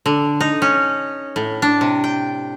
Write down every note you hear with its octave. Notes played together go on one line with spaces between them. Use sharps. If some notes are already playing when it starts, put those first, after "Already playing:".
D3
D#4
C#4
A2
D4
C3
G5